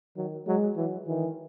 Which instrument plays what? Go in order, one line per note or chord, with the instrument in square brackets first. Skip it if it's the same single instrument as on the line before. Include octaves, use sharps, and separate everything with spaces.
[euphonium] D#3 [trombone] F#3
[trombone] F#3 [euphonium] G#3
[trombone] E3 [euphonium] F#3
[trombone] D#3 [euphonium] E3